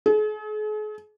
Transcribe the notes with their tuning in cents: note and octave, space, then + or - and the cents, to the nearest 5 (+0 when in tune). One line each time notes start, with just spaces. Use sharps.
G#4 +45